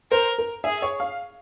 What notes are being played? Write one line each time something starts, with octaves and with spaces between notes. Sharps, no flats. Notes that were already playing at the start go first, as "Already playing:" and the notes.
A#4 C5
A#4
G#4 E5
C#5
F5